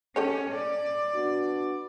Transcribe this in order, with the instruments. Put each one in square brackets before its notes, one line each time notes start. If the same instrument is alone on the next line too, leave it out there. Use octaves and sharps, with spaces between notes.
[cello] C#4 [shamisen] G4 A4 C#5
[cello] D5
[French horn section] B3 D4 F#4